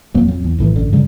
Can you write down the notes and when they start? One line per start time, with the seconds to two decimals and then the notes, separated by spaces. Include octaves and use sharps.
0.14 D#1 F2 F#3 A#3
0.28 F2 F#3
0.44 E2
0.59 B1 A2 E3
0.76 A1 F#2 D3
0.92 F#2 C#3 F#3 G3